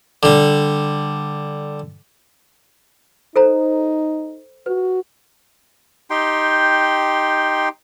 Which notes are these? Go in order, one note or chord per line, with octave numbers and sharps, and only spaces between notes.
D3 G3
D#4 A4 C5 A#5
F#4 B4
D#4 G4 G5 C6